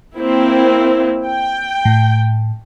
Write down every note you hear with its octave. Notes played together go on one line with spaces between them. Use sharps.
A#3 C4 E4
G5
A2